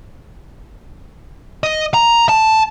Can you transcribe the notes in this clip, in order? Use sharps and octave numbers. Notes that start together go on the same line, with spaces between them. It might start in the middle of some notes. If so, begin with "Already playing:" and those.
D#5
A#5
A5